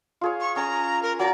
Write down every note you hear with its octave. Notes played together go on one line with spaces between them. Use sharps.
F4 G#4 C#5
C#6
C#4 G#5 A#5
A#4
F#3 D5 A#5